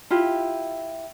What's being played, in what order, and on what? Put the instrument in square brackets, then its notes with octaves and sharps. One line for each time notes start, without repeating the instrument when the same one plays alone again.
[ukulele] E4 F4 G4